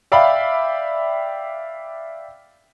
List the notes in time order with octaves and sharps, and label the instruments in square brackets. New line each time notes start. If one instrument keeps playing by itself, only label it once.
[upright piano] D5 E5 F5 G5 B5